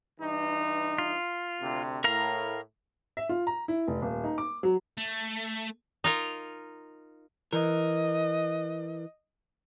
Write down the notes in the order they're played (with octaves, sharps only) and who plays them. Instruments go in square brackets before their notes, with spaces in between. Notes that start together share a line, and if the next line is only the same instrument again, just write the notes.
[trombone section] G2 E3 D#4
[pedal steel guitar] F4
[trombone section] D2 C3
[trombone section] A2 [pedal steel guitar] A#4 F5 A#5
[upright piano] E5
F4
A#5
E4
F1
D#1
D#4
D6
F#3
[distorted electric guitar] A3
[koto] D#4 F4 A#4
[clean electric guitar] E3 A#4 [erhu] D#5